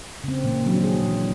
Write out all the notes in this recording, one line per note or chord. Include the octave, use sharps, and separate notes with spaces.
C#3 C4
A#2 E3 A#3
D#3 F3 F#3 C4 D4
F#3 G#4
A#2 E3